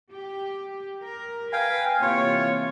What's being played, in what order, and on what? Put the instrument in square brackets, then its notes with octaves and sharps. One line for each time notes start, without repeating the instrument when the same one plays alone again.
[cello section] G4
A#4
[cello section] B4 [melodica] F5 G5 [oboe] G#5
[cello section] C3 E3 A#3 [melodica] F4 [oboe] C#5